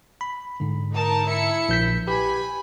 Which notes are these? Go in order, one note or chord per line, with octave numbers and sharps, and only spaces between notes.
B5
G#2 D3
D#4 A#4 A5
E4 E5 C#7
A#1 G6 B6
G4 B4 G#5 B5